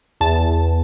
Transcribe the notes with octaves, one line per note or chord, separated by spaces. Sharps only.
E2 A5